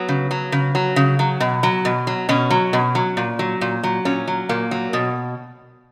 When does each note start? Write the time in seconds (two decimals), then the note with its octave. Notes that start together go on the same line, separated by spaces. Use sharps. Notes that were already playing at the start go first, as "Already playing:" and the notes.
Already playing: F#3 B3
0.08 C#3
0.31 F#3
0.52 C#3
0.75 F#3
0.96 C#3
1.19 F#3
1.40 B2
1.63 F#3
1.85 B2
2.07 F#3
2.29 B2 C#4
2.50 F#3
2.73 B2
2.95 F#3
3.17 A#2
3.39 F#3
3.61 A#2
3.83 F#3
4.05 A#2 C#4
4.28 F#3
4.49 A#2 A#3
4.71 F#3
4.93 B2